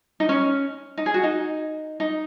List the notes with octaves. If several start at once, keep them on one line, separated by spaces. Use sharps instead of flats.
D#4
C#4
D#4
G#4
F#4
D#4
D#4